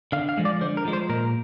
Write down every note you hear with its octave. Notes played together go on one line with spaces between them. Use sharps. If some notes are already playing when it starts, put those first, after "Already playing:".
D3 F5
F5
F3 G#3
D5
D3 C5
A#4
F3 G#3
C5
A#2 A#4